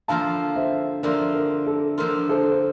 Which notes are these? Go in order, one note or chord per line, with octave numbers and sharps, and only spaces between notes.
D3 F3 A#3 F4 F5 A5
C5 E5
D3 F3 A#3 F4 A#4 D5
A#4
A4
D3 F3 A#3 F4 A#4
A4 C5
C5